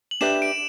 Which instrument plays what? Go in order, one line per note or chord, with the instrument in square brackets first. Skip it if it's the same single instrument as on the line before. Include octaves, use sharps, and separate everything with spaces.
[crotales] F#7
[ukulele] D4 G4 B4 E5 [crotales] E7
[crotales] D7